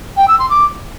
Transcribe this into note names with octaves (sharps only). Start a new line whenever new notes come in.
G5
E6
C6
D6